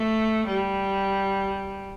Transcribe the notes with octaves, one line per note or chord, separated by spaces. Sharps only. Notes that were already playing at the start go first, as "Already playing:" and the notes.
Already playing: A3
G3